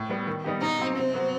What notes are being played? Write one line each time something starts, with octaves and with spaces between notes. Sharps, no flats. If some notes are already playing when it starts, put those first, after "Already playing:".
Already playing: A2
G3 B3
D#3
G3 B3 D#4 G4
B2 D#4
F#3 C4
C3 C4
F#3 B3 F#4